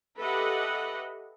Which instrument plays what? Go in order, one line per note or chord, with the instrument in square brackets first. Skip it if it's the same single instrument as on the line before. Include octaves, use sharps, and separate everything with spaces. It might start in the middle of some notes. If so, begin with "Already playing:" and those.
[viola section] G4 A4 B4 D#5 E5 F#5